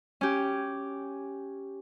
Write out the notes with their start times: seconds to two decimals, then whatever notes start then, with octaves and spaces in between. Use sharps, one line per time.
0.21 C#4 G4